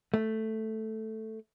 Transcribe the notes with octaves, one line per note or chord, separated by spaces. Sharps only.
A3